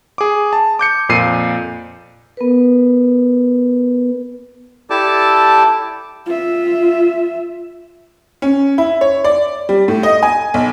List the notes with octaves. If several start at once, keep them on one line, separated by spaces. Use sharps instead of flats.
G#4 D6
A5
D6 G6 C#7
F2 A#2 C7 D#7
B3 A#4 B4
E4 G4 A4 D5 A5 D6
F4 E5
C#4
E4
C#5
D5
G3
A2
D#5
G#5
B1